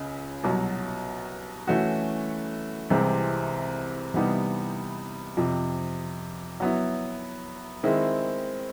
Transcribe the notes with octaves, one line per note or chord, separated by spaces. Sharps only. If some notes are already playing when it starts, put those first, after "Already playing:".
Already playing: C#2 C#3
C2 B2 F#3
E3 A3 C#4 F#4
C2 C3 E3 G#3 C4
C3 E3 G3 B3 D#4
F2 C3 F3
F#3 B3 E4
D#3 G#3 C4 E4